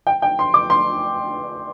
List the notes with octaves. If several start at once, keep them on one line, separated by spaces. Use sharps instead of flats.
G5
G5
C6
D6
C6